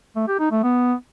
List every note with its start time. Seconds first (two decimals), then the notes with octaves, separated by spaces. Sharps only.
0.16 A3
0.28 G4
0.39 D#4
0.51 A3
0.63 B3